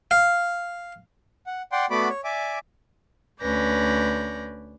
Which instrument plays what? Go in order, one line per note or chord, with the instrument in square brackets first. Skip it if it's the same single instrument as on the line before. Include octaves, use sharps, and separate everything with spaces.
[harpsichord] F5
[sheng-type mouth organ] F#5
D5 F#5 G5 C6
A3 B3 F#4 D5 B5 D6
C#5
D5 E5 G#5 D6
[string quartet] D2 C#4 B4 D5 G6 A#6